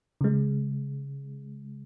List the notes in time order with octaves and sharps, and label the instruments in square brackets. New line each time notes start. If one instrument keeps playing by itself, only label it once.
[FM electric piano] C#3 G#3